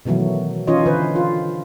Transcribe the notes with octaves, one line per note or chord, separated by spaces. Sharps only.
B2 D#3 E3 F#3 A3
E3 C#4 D#4 F4 C#5 D#5
D3 E3 B4 C5
F4